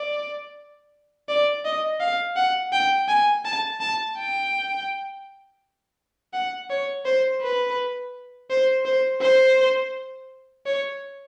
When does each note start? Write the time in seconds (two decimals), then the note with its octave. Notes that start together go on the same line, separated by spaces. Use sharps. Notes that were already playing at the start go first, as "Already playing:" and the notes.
Already playing: D5
1.29 D5
1.65 D#5
2.00 F5
2.36 F#5
2.73 G5
3.08 G#5
3.45 A5
3.80 A5
4.18 G5
6.33 F#5
6.70 C#5
7.05 C5
7.41 B4
8.50 C5
8.85 C5
9.22 C5
10.66 C#5